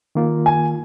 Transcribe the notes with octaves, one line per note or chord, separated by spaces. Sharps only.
D#3 A#3 F4
G#5